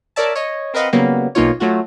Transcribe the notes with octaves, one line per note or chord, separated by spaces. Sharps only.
A#4 C#5 D5 E5 A5
C#5 D#5
C4 A#4 B4 D#5 F5 F#5
C#3 F#3 G3 A#3 B3
B1 A#3 D#4 F4 C#5
F#3 A3 F4 F#4